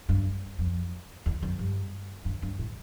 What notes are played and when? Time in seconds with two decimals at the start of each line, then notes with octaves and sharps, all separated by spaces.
0.09 G2
0.58 F2
1.26 E2
1.43 F2
1.59 G2
2.25 G2
2.42 G2
2.59 A2